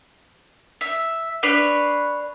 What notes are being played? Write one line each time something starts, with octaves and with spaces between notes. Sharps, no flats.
E5
D4 B4 C#5